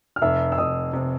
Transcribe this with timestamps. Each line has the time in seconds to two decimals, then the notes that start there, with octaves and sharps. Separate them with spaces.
0.16 F6
0.22 F1 E5 E6
0.52 E6
0.58 F1 D#5 D#6
0.93 C3